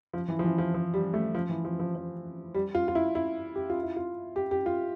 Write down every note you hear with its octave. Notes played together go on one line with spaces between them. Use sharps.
F3
E3
F3
E3
F3
F3
G3
A3
F3
E3
F3
F3
F3
G3
F4
F4
E4
E4
G4
F4
E4
F4
G4
G4
F4